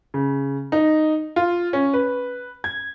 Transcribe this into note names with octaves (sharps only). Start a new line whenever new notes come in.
C#3
D#4
F4
C#4
B4
G#6